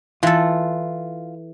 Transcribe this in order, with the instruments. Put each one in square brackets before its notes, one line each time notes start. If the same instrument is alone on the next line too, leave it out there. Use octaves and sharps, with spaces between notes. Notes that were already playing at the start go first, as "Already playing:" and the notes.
[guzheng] E3 A4 [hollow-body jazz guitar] F4